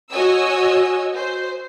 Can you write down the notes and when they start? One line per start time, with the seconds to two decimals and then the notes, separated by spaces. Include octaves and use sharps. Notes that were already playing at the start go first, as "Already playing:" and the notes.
0.11 F#4 C#5 D#5 G#5 E6
1.16 C5